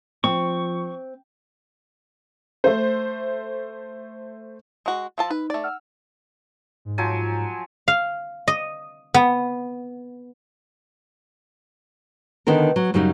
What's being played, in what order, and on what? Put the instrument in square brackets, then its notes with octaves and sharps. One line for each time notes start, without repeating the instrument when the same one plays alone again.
[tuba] F3 [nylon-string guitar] C4 [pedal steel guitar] C#6
[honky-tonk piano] A3 C5
[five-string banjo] G#3 F#4
[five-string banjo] F3 F4 A5 [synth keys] E6
[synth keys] D#4 [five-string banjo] B4
[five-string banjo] A3 D5
[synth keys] F#5 E6 F6
[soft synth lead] G#2
[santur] F3 F#3 G#5
[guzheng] F5
D#5
B3
[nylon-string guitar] D3 D#3 B3 D#4 A#4
F#3
F#2 C#3 F#3 G3 D#4